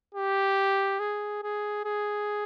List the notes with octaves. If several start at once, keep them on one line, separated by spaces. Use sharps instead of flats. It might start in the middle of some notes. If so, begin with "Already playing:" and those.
G4
G#4
G#4
G#4